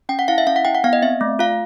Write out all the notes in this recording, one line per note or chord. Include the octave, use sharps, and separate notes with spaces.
C#4 G5
F#5
E4 F5
E5
C#4 F5
F#5
E4 G5
F#5
B3 F5
D#5
C4 E5
A3
F4 F5